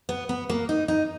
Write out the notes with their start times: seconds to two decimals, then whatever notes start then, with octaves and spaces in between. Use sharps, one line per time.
0.09 B3
0.29 B3
0.49 A#3
0.69 D#4
0.88 D#4